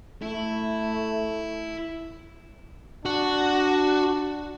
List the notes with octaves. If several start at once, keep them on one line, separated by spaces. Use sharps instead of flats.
A3 E4
D4 F#4